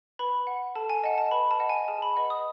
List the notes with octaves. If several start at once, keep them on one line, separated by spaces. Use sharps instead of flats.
B4 B5
F#5
A4 A5
G#5
D#5 F#5 A5
A5
B4 B5
A5
D#5 F#5
G#5
G#4 A5
B5
B4 D#5 F#5
D#6